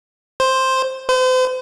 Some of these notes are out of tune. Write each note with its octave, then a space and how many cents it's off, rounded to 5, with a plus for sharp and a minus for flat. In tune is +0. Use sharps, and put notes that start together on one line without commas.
C5 +5
C5 -40